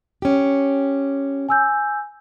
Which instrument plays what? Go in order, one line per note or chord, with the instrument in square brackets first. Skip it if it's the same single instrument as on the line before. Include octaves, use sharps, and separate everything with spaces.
[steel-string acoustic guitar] C#4 G4
[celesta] G#5 E6 G6